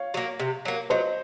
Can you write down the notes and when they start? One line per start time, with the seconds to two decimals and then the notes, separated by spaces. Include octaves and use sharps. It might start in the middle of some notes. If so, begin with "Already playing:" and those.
Already playing: C#5 F5
0.14 F#3 A#3
0.40 C3
0.65 F#3 A#3
0.90 F#3 C5 D#5